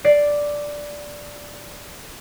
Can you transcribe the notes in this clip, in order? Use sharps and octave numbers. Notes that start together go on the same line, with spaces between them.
D5 C7